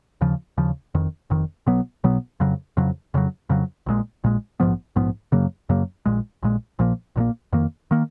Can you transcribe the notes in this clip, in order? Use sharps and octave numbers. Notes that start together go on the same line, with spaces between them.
D#2 C#3 F3
D#2 C#3 F3
F1 F2 D#3
F1 F2 D#3
B1 B2 F#3 B3
B1 B2 F#3 B3
F2 C#3 F#3
F2 C#3 F#3
F2 C#3 F#3
F2 C#3 F#3
A#1 A#2 G#3
A#1 A#2 G#3
A#1 G#2 F3 B3
A#1 G#2 F3 B3
F#2 C#3 F#3 A#3
F#2 C#3 F#3 A#3
A#1 A#2 G#3
A#1 A#2 G#3
A#1 A#2 F3 A#3
A#1 A#2 F3 A#3
F2 D#3 A#3
D#3 A#3